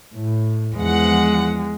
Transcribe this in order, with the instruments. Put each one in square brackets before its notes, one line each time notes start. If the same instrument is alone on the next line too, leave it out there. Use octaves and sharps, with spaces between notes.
[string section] A2
[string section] E2 F3 F#5 [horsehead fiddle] G#3